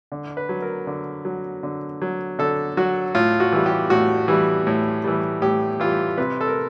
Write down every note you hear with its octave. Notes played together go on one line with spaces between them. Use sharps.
D3
B4
F#3
A#4
D3
F#3
D3
F#3
D3 A4
F#3 F#4
A2 F4
F#4
E3 G3
G4
A2 F#4
E3 G3
A2
E3 G3
A2 G4
E3 G3 F4
C3 B4
A4
A#4